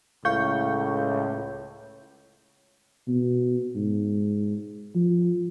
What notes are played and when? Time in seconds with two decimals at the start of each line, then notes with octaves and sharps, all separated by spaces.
0.25 C#2 A2 F5 C#6 G6
3.08 B2
3.76 G#2
4.95 F3